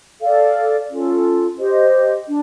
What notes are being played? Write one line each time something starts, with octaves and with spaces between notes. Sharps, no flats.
A4 D5 F5
C#4 F4 A4
G4 C5 D#5
D4